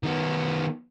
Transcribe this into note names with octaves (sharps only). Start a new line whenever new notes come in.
D#3 B3